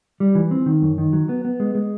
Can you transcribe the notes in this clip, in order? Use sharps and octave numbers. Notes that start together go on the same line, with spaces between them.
G3
E3
C4
D#3
F#2
D#3
F#3
B3
B3
G#3
G#3